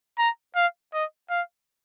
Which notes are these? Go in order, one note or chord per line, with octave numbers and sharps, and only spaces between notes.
A#5
F5
D#5
F5